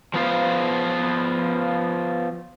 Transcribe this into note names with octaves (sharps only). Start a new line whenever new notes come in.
F3 B3 F4 C5